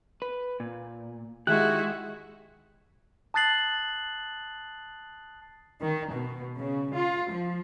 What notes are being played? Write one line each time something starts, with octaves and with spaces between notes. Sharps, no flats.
B4
A#2
D#3 G#3 E4 F#4 G4 F#6
A5 D#6 F#6 A6 C7 F#7
D#3
B2
C#3
F4
F3